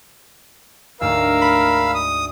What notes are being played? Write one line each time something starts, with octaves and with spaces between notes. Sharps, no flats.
D2 G#2 A#4 F5 E6
B5
D#6